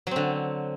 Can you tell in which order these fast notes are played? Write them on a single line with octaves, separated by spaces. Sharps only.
F#3 C4 D3